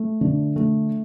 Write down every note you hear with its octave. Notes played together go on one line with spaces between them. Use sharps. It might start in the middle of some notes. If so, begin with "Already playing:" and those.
Already playing: A3
D3
A3